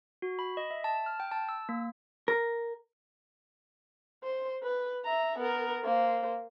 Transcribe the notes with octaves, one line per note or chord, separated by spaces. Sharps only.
F#4
B5
D#5
E5
A5
F6
G5
A5
E6
A#3
A#4
C5
B4
E5 A#5
B3 A#4
A#3 C5